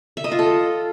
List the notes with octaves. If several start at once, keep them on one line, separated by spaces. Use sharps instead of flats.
E5
D#5
F4
A4